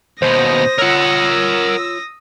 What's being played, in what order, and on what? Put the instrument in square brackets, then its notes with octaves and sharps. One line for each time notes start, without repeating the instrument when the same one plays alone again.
[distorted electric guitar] D#2 B2 [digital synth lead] C5 [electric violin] D#6 A#6
[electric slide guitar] F4 C#5 [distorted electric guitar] A#4 F#5 [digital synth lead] E6